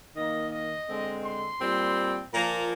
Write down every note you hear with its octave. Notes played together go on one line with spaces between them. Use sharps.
D#3 A#3 D#5
D#5
D3 G#3 C4
C6
A#2 G3 C4
A#2 F3 A#3 A#5